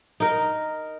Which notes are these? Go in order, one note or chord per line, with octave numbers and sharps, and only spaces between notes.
D#4 A#4